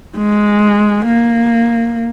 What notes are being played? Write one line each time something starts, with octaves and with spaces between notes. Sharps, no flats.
G#3
A#3